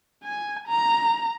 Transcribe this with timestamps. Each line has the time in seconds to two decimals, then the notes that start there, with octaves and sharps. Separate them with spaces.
0.23 G#5
0.67 A#5